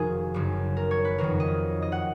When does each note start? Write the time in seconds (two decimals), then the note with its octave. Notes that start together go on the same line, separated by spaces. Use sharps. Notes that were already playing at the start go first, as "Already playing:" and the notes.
Already playing: F1 F2 D#3 F#4 G#4 A#4
0.34 F#1 F#2 D#3
0.77 A#4
0.91 C#5
1.05 B4
1.18 F2 D#3 F#3 A#4
1.40 D#5
1.82 D#5
1.92 F#5